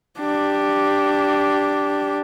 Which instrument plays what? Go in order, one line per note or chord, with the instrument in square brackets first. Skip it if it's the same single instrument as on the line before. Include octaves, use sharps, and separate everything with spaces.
[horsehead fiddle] D4 G4